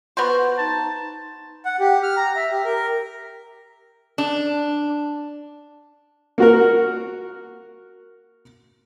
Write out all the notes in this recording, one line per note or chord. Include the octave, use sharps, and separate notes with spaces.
B3 F#4 B4 C5
D#4 A5
F#5
G4
F6
A#5
E5
G4
A#4
D4
A#3 F#4 A#4